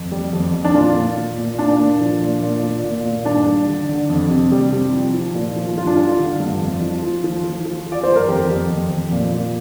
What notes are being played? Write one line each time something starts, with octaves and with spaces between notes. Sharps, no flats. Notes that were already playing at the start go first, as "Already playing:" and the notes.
Already playing: F2
G3
F2
F2
D4
A#2 F4
A#2
A#2
A#2
A#2 D4
A#2
F3
A#2
A#2
A#2
A#2
A#2
G2 D4
G3
D3
D3
F2
C3
G3
C3
F3
F3
A#2
F3
G2 F4
D4
G3 F4
D3
G2
F2
F3
F3
F3
F3
F3
F3
D5
G2 C5
A#4
F2 G4
F2
F2
F2
A#2
A#2